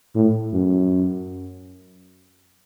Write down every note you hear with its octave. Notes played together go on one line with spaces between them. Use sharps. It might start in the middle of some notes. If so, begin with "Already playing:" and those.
A2
F#2